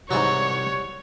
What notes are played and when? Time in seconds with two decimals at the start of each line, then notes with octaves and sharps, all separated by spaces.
0.11 C2 G#2 E3 F#3 F#4 G4 C#5 D5